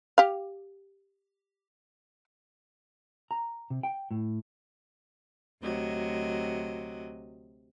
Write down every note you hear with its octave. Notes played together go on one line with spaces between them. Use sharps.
G4 F5
A#5
C3
G5
A2
D2 C3 F#3 D#5